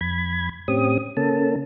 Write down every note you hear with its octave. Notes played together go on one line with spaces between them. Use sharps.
F2 B5 G#6
A2 C4 C#4 G4 D#6
C#3 A#3 C#4 A4 A5